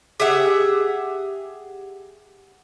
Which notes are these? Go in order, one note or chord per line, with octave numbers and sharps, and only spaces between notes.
G4 G#4 E5 F#5